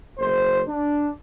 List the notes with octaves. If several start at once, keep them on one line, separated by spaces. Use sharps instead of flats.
F#1 C5
D4